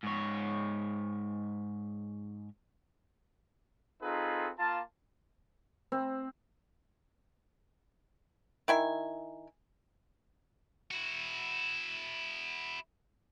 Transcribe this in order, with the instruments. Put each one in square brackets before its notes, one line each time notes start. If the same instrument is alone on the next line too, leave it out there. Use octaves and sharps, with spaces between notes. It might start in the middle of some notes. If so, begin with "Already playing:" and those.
[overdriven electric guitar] G#2 C#5
[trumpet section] C4 D#4 F4 G#4 A4 B4
A#3 F4 F5 A5
[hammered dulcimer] C4
[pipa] D#3 E4 G#5
[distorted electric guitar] E4 F#4